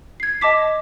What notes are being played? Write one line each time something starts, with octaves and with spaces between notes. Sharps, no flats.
G#6 C7
D#5 A5 D6 B6